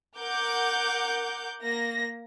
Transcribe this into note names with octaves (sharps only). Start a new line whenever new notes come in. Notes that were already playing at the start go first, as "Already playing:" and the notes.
A#4 F#5 D6 G6
A#3 A#6